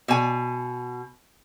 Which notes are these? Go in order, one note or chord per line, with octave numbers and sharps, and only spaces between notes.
B2 G#5